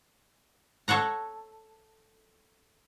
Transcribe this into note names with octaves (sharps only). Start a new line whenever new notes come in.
A4 C#5 F#5 A#5